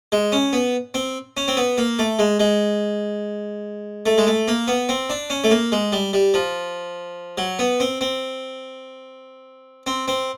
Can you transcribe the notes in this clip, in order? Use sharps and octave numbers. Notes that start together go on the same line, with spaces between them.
G#3
C#4
B3
C4
C#4
C4
B3
A#3
A3
G#3
G#3
A3
G#3
A3
A#3
B3
C4
D4
C#4
A3
A#3
G#3
G3
G3
F3
F#3
B3
C4
C4
C4
C4